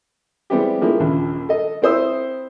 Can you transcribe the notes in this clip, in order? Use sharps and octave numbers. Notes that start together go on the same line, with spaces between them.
G3 G#3 B3 C4 E4 G4
D3 F3 G#3 A#3 E4
A#1 D#2 C#3
A4 D#5
C4 E4 C5 D#6 E6